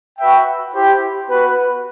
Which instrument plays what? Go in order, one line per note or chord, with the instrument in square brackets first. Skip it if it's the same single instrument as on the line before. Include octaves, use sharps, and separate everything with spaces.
[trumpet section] F#4 B4 E5 G5
E4 G4 C5 G5
B3 F#4 B4